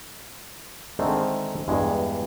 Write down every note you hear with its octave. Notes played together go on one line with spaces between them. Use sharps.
D3 D#3 G#3 A3 C4
E2 G2 G#3